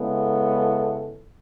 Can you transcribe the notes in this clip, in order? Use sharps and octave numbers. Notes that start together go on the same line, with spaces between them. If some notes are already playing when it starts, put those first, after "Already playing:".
Already playing: C#3 G#3 B3 E4 A4